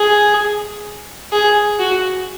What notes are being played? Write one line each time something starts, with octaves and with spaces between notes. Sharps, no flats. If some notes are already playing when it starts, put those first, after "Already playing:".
Already playing: G#4
G#4
F#4